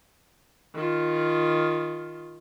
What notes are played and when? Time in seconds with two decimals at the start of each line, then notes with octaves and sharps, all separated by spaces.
0.75 D#3 F4